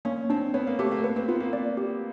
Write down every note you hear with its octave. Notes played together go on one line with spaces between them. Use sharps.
A#3 C#4
C4 D4
B3 C#5
A#3
A3 G4
A#3
B3 B4
C4
B3 F4
A#3
D5
G4